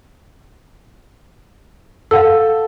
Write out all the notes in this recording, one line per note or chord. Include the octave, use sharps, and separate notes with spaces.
A4 F5 F#5 E6